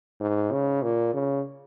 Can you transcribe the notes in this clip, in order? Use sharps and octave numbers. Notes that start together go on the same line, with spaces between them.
G#2
C#3
A#2
C#3